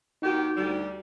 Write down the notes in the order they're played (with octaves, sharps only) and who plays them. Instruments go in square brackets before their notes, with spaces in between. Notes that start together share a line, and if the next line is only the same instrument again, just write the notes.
[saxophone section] D#2 D#3 G4 [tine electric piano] D#4 F#4
[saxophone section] D2 G3